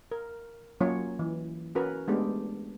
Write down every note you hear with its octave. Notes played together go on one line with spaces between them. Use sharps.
A#4
F#3 A#3 C#4 F4 C#5
E3
C#4 F#4 A#4 B4
G#3 A3 B3 D4 G4